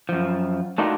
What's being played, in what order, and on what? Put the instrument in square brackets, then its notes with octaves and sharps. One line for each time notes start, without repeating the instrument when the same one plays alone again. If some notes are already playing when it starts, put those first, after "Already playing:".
[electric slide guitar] F#2 F3
A3 D4 D#4 F4 F#4 A#4